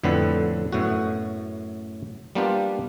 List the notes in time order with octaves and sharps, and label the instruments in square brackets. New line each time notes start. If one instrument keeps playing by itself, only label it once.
[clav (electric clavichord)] F2 A2 D3 B3 C4 B4
F#2 A2 B3 F#4
G3 A#3 B3 D4 F4 G4